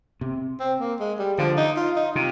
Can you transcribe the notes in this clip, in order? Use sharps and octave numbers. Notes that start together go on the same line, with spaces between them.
C3
C4
A#3
G#3
G3
D3 F3
D#4
F4
D#4
C3 F4